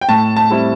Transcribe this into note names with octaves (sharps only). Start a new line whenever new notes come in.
G5
A2 A5
A5
G3 C4 E4